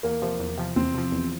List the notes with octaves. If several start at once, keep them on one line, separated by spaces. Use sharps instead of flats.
E2 A#3
C3 F3
E2
C3 F3
E2 C4
C3 F3
E2